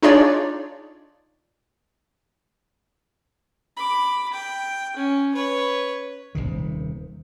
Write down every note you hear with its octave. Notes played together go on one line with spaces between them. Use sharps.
D4 D#4 F4 G#4 C#5 D5
B5 D6
G5
C#4
B4 C#5
D#1 G#1 C3 D#3